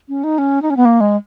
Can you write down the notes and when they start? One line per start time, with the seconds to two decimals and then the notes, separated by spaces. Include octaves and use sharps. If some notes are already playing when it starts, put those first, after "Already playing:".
0.08 C#4
0.24 D#4
0.38 C#4
0.62 D#4
0.70 C#4
0.77 B3
0.85 A#3
1.00 G#3